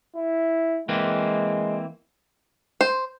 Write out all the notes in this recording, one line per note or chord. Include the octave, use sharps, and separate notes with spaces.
E4
E3 G#3 A#3 C4
C5